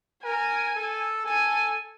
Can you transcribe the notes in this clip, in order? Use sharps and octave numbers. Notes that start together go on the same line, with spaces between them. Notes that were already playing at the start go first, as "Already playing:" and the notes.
A#4 G#5
A4
A4 G#5